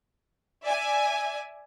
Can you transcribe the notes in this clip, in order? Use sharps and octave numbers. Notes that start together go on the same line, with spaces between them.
D5 E5 G#5